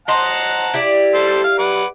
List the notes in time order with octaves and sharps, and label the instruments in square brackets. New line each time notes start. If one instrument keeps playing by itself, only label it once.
[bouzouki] C5 D#5 [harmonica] F#5 A5 A#5
[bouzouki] E4 G4 D5
[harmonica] G3 A4 C5
F5
B4 F#5 D6